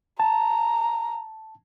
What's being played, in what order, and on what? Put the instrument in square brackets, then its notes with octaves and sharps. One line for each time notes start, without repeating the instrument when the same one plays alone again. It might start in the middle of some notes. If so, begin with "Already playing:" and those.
[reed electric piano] A5 [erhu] A#5